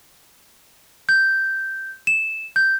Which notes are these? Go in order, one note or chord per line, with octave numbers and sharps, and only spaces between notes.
G6
E7
G6